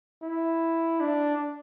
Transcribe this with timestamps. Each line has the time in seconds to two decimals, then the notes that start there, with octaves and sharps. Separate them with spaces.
0.22 E4
1.01 D4